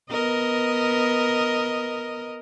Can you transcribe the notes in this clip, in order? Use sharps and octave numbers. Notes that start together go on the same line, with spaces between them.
B3 A#4 D#5